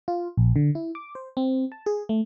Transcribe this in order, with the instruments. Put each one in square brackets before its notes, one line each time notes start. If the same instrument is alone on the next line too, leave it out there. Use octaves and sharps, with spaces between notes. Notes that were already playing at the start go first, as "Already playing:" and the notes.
[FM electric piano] F4
A#1
D3
E4
D6
C5
C4
A5
G#4
A3